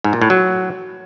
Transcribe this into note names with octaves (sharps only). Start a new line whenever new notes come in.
G#2
A#2
A2
F#3